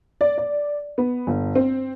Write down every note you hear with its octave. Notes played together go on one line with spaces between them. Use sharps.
D5
D5
B3
G1
C4